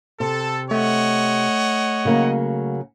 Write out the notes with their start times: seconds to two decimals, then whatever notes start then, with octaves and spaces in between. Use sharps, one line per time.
0.20 C3 A4
0.71 A3 C#5 D#5 F#5
2.05 C#3 F#3 A#3